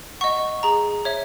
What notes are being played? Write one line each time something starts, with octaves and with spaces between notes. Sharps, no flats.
D#5 F#5 C#6
G#4 A#5
C#5 E5